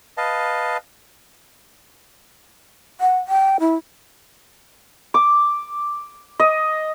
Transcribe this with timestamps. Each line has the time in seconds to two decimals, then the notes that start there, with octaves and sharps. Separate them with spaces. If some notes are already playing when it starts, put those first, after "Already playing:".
0.17 B4 D#5 F5 A5
3.01 F#5
3.28 G5
3.60 E4
5.14 D6
6.40 D#5